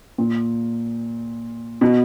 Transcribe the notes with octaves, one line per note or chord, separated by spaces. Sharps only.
A#2
B2